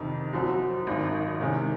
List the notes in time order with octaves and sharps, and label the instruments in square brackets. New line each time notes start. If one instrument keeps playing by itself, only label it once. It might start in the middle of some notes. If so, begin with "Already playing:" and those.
Already playing: [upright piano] F2 C3 D#3
F#2 F3 C4 F#4
G#1 F#2 D#3
C3 D#3 G#3 C#4